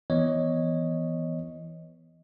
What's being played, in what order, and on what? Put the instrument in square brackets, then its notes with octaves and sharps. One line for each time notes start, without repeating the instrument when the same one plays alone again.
[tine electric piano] E3 B3 C#5 D#5